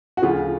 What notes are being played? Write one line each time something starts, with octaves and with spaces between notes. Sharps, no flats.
F#4
D2 C#3 F3 F4